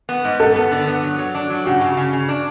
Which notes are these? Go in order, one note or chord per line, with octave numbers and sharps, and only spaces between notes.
B3
G#2
B3 A4
B3
D3
B3
F#3
F#3
D4
F#3
C#3 F#4
C#3
C#3
C#3
D4